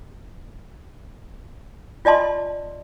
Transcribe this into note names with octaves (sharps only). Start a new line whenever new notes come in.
F4 D5 D#5 A5 C6